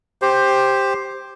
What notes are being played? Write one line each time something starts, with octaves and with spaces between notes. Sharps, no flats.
G4 C5